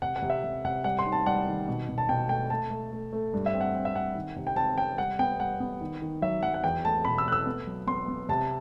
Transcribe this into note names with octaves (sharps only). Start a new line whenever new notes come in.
C3 F#5
F#5
C3
E5
C3
C3 F#5
G3 F#5
C6
D#4
A5
G3 F#5
D#3
B2
B2
A5
B2 G5
A3 G5
A3 A5
A3
A3
A3
G2
E5
C4
F#5
C4
E5
C4 F#5
D#3
C3
G5
C4 A5
C3 G5
G3 F#5
B3 G5
G3 F#5
B3
D#3
D#3
F#3 E5
F#3 F#5
F#5
E2 G5
A3 A5
B2 B5
E6
A3 F#6
E6
B3
F#3
B3 C6
B3
C3 A5